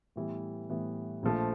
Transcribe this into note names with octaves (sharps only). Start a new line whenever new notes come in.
A2 E3 G3 B3
A2 E3 G3 B3
A#1 A#2 F3 A3